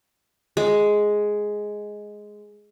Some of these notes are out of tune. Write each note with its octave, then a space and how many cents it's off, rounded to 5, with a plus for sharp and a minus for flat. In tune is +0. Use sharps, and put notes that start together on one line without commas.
G#3 +5